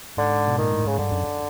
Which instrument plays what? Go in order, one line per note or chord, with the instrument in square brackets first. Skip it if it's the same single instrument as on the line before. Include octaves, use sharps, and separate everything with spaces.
[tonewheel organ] G#2 [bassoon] D3
[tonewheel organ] B2
[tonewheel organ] A#2 [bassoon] D#3
[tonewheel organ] A2
[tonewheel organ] G#2 [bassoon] C#3
[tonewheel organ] G2 [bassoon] D3
[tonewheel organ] F#2